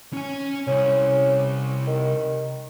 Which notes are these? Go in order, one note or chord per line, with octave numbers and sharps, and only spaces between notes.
C#4 G#5
C2 C#4
D#3